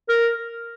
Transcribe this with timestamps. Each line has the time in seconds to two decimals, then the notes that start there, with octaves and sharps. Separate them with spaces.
0.09 A#4